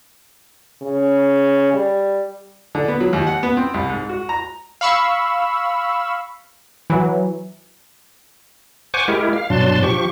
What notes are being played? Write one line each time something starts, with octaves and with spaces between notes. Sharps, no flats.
C#3
G3
D3
B3
F#3
D#2
F#5
B3
C4
C2
G#2
F#4
A#5
F5 B5 C#6 E6
E3 F#3
C5 F#5 G#5 C#6 D6
G#3 E4 G4 A#4
F5
G2 B2 F#3 D4 A5 C6
F3 G4 C#6